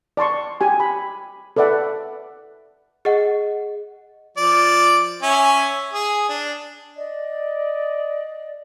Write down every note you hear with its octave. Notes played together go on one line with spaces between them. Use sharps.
D5 A5 C6 C#6
G4 G#5
B5
A4 B4 D5 E5 F#5
G#4 D#5 F#5
F3 D5
C#4 E5 G#5
G#4
D4
D5 D#5